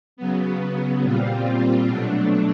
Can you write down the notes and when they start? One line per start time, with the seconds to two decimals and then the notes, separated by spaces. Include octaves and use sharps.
0.17 C#3 F#3 B3
1.03 A#2 G3 C4 F4
1.88 B2 F#3 A3 D4